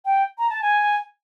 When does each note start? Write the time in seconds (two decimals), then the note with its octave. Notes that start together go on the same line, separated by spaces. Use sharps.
0.05 G5
0.38 A#5
0.50 A5
0.62 G#5